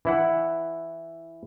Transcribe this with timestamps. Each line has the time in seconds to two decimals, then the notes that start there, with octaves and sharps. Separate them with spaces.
0.05 E3 E4 F#5